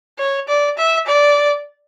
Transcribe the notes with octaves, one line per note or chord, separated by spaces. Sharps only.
C#5
D5
E5
D5